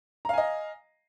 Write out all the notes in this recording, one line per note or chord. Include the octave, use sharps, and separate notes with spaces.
D#5 F5 G#5 A#5